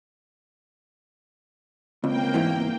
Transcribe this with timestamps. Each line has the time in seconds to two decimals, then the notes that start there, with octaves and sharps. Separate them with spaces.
2.04 C#2 A#3 C4 G5
2.34 E2 G#2 E3